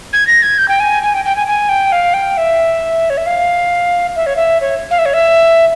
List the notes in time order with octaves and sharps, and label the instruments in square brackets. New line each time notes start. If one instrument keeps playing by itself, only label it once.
[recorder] G#6
A#6
G#6
G6
G5
G#5
G#5
G5
G5
G#5
G#5
G5
F5
G5
E5
C#5
E5
F5
E5
C#5
E5
C#5
F5
E5
C#5
E5